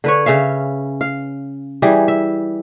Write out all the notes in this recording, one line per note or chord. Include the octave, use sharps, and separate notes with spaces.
D3 B4 C#5
C#3 C#4 E5 F5
F5
E3 G3 G#4
E5